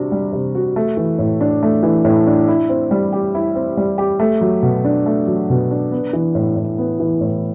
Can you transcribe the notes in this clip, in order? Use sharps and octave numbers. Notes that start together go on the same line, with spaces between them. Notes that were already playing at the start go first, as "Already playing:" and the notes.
Already playing: C3 G3 D4 F#4
G3
C3
F#4
A3
E3
A2
D4
A3
E3
A2
D4
E4
C4
G3
G4
E4
C4
G3
G4
A3
F#3
B2
D4
A3
F#3
B2
D4
B3
E3
A2
A2
B3
E3
A2